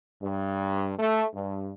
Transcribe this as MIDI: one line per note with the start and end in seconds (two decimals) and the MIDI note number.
0.22 0.94 43
0.99 1.25 57
1.35 1.73 43